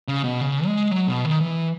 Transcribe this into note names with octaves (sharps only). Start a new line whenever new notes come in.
C#3
B2
C#3
G#3
F#3
B2
D#3
E3